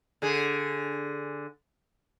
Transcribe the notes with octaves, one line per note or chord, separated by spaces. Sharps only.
D3 G#4